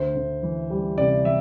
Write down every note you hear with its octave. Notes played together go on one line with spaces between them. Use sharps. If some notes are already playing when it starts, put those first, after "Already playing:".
Already playing: D2 C5
D2
E3
G3
C3 D5
E3 E5